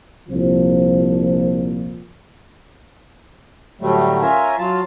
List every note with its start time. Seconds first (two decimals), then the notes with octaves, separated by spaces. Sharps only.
0.29 C2 A#2 F3
3.81 A2 D3 F#3 G3 A3
4.22 C#4 F4 A#4 E5 G#5
4.59 F#3 F4 A5